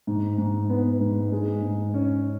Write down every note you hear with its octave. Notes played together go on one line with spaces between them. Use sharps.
G#2
G#2
B3
G#2
G#3
G#2
C#4